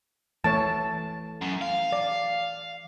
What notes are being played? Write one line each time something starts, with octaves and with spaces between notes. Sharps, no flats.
E3 A3 C#5 A5
F#2
F5
D5